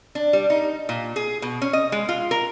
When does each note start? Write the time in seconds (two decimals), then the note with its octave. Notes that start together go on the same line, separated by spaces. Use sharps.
0.15 D4
0.33 G3
0.50 D#4
0.89 A#2
1.16 G#4
1.42 B2
1.62 C#4
1.73 D#5
1.92 G#3
2.09 F4
2.31 A#4